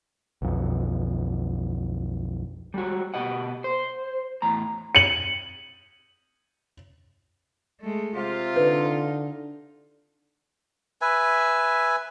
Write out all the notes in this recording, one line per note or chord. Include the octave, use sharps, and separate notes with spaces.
B1 F2
G3 G#3 F#4
B2 G4 D#5 F#5
C5
E2 A2 A#5
C#7 F#7
G#3 A3
C3 F4 G4
D3 D#4 B4
B4 E5 G#5